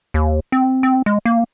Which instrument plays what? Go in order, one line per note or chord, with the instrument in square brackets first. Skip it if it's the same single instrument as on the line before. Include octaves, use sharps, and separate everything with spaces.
[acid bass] D#2
C4
C4
G#3
A#3